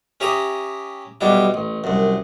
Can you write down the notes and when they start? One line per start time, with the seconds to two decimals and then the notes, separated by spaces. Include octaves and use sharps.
0.20 C#4 G4 E5 A#5 D#6
1.21 B1 B2 G3 D4 E4
1.54 A1
1.84 C2 F#2